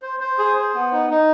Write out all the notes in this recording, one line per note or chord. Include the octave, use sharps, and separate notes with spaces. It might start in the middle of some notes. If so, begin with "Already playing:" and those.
C5
C5
G#4
C5
B3
D#4
D#4